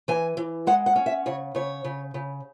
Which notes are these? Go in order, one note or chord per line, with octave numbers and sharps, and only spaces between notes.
E3 G#5
E3
G#3 F#5
F#5
C#4
E5
C#3 C#5
C#3 C#5
C#3
C#3